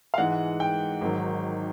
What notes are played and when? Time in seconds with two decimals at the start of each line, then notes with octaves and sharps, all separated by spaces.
0.14 F5
0.18 G#2 E3 G#3 F#5
0.60 G5
1.01 G#1 G#2 D#3 F#3